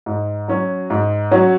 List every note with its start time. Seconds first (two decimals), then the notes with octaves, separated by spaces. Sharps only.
0.06 G#2
0.48 F#3 C#4 F#4
0.90 G#2
1.31 F#3 C#4 F#4